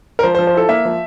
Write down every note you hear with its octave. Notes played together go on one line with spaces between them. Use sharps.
A#4
F3 C5
C5
F3
C5
E4 A4
A#3 E5
F3